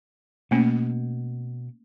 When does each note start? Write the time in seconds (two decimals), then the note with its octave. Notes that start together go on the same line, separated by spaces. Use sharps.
0.51 B2 A3 A#3 C#4